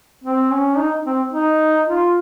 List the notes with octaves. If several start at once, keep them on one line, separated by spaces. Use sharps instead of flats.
C4
C#4
D#4
C4
D#4
F4